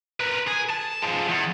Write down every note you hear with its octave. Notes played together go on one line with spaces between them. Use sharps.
A#4 B4
G#4
A5
F3 G#3
E2